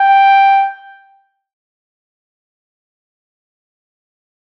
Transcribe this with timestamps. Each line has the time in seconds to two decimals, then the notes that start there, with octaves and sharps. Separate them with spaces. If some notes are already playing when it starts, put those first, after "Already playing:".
Already playing: G5